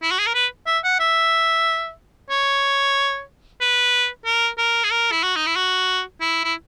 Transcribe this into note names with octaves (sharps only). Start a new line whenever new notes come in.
E4
F#4
G#4
A#4
B4
E5
F#5
E5
C#5
B4
A#4
A#4
G#4
A#4
E4
F#4
D#4
E4
F#4
E4
E4